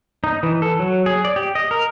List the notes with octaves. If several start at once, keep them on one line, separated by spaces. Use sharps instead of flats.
D#4
E3
A4
F#3
G#4
D5
G4
D#5
A#4